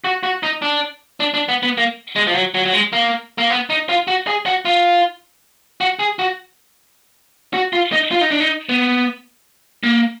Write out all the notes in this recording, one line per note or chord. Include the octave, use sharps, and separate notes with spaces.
F#4
F#4
D#4
D4
D4
D4
B3
B3
A#3
G#3
F3
F#3
F#3
F#3
G#3
A#3
A#3
B3
D#4
F4
F#4
G#4
F#4
F4
F#4
G#4
F#4
F#4
F4
D#4
F4
D#4
D4
D#4
B3
A#3